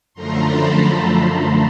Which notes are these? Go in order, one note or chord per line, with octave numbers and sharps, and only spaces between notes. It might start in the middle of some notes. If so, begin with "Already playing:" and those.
F#2 D3 F3 A3 A#5 C6
A5 B5